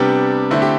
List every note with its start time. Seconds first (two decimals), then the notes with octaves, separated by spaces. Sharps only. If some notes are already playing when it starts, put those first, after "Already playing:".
Already playing: C3 G3 B3 D4 G4
0.50 D3 A3 C4 E4
0.62 G4